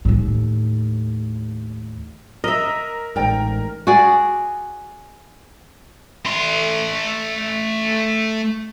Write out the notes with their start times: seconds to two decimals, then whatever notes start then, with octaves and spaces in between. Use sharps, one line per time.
0.05 D#2 A2
2.44 A#4 D#5 E5
3.16 A1 G#2 A#4 C5 D5 G5
3.87 F#4 G#4 D5
6.25 A3 C6